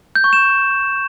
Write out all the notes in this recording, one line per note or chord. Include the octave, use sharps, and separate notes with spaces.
G6
C#6
E7